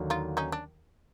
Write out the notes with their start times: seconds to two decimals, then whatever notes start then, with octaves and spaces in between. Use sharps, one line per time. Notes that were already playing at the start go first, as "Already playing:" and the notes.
Already playing: D#2 D3 F#3
0.10 D#4 F4
0.37 C#4 D#4
0.52 D4